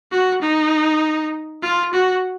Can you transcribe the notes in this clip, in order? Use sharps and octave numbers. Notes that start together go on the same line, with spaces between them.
F#4
D#4
F4
F#4